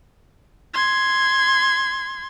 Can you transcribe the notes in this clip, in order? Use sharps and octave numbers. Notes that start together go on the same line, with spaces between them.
C6 G#6